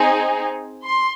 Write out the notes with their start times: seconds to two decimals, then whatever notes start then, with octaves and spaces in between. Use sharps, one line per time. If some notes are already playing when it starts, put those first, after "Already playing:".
Already playing: C4 D#4 G#4
0.85 C6